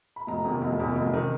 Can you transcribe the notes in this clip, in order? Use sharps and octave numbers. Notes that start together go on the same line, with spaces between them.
B5
F1 A#5
E2 C3 D#3
F1
E2 C3 D#3
F1
C3 D#3